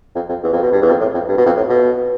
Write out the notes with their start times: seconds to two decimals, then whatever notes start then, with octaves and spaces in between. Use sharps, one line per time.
0.15 F2
0.29 F2
0.43 E2
0.52 F2
0.62 B2
0.72 G2
0.81 E2
0.90 F2
1.00 A2
1.14 F2
1.28 G2
1.37 B2
1.46 F2
1.56 A2
1.69 B2